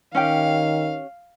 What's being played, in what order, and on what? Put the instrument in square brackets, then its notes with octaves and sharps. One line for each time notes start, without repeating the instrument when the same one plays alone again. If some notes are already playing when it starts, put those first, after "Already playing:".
[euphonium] D#3 [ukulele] C#4 G4 G5 [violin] F5